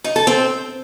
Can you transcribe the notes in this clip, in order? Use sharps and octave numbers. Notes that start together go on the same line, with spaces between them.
D#4
A4
C4